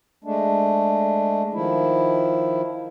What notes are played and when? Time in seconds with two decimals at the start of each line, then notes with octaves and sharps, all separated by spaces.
0.24 G#3 A3 D4
1.54 D#3 F3 E4